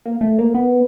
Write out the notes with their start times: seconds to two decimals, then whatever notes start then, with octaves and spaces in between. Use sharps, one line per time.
0.06 A#3
0.21 A3
0.39 A#3
0.54 B3